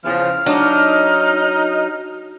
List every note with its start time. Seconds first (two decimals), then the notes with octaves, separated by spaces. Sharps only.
0.04 E2 C#3 F3 F6
0.46 F#3 D4 D#4